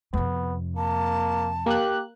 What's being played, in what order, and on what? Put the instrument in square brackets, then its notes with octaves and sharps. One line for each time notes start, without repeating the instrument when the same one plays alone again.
[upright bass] F2 C3 [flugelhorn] B3
[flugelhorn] A#3 [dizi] A5
[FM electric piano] A#3 F#6 [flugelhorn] G4